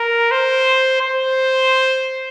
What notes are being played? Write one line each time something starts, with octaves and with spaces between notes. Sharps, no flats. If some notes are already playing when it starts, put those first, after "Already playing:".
Already playing: A#4
C5
C5